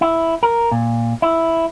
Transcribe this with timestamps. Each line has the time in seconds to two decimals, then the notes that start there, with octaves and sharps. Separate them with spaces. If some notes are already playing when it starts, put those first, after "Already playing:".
0.01 E4
0.43 A#4
0.72 A#2
1.22 E4